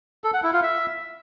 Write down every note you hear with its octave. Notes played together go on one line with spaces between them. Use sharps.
A4
F#5
E4
F4
E5